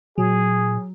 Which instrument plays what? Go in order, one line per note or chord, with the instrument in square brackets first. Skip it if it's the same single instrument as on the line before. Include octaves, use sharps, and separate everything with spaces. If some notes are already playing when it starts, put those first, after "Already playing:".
[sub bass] A#2 [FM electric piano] F#3 [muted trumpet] G#4